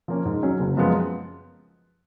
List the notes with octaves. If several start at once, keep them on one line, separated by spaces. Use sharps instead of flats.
F3 A#3 C#4
G#2
F#3 C#4
F#1
F#2 F3 G#3 B3